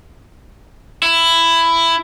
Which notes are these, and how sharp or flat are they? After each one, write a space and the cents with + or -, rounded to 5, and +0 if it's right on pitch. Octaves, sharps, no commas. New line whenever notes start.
E4 +10